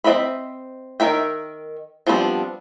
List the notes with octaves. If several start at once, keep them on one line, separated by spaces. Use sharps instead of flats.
C4 A#4 D#5 E5 B5
D#3 A#4 E5 G5
F3 G3 B3 C4 D4